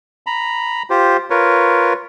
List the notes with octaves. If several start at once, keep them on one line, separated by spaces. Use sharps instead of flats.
A#5 B5
F4 G4 C5
F4 A#4 B4 C#5